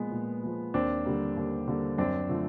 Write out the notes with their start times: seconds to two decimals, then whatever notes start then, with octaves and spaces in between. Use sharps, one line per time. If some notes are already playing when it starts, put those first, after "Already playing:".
Already playing: A#2 F3 G#3 B3
0.11 A#2
0.43 F3 G#3
0.74 D#2 C4 D4
1.05 D3 G3 A#3
1.37 D#2
1.68 D3 G3 A#3
1.98 F#2 C4 D4
2.29 D3 F3 A3